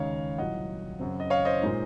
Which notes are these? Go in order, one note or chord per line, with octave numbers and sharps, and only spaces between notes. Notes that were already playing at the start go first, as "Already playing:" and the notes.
Already playing: D#2 C#3 G#3 D#4 C#5 F5
C2 A#2 F#3 D#5 F#5
F#2 C#3 F#3 C4
D#5
C#5 F5
C5 D#5
A#2 G#3 D#4